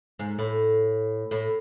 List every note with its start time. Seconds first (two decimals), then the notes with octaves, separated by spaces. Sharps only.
0.19 G#2
0.39 A2
1.31 A2